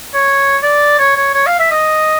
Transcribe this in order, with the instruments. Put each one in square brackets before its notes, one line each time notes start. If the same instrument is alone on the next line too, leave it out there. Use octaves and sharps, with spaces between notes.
[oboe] C#5
D5
C#5
C#5
C#5
F5
E5
D#5